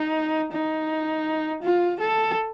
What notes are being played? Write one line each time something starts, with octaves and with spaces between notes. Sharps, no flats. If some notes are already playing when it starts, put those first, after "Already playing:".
Already playing: D#4
D#4
F4
A4